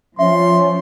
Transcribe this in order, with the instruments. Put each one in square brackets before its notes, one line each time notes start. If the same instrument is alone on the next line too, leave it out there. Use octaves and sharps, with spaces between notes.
[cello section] F3 [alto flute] C#4 [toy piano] E5 [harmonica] C6